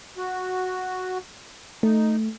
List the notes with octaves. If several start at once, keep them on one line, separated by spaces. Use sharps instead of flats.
F#4
A3 D#4